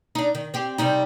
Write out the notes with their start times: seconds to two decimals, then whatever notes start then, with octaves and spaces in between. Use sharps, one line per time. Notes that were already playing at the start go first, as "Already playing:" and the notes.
0.15 D4 D#4
0.35 D#3
0.54 C4 G4
0.78 C3 G3 D#4